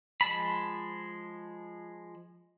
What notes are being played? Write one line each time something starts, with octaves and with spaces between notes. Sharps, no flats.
F3 G#3 A5 B5